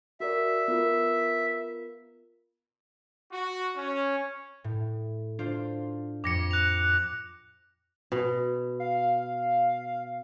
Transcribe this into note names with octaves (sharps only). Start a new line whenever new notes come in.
F#4 A#4 D5 E5
B3 F4 A#4
F#4
C#4
A2
D4 F4 C5
F2 D6 A#6 C#7
F#6 F7
B2
F5